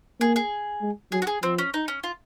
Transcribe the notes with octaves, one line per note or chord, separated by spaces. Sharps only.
A#3 G#4
G#4
G#3
F#3 G#4
F#4
G#4
F3 C4
C#4
D#4
C#4
F4